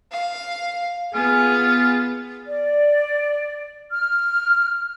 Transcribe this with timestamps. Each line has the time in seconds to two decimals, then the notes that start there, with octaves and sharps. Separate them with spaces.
0.12 F5
1.14 B3 F4 G#4 G#5
2.46 D5
3.91 F6